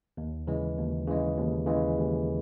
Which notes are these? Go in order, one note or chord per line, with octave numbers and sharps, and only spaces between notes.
D#2
C#3 E3 G#3
D#2
C#3 E3 G#3
D#2
C#3 E3 G#3
D#2